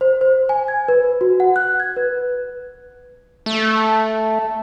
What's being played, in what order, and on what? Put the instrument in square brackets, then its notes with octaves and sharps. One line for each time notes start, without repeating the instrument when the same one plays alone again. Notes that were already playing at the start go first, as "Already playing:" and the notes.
[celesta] C5
C5
G#5
G#6
B4
F#4
F#5
F#6
G#6
B4
[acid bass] A3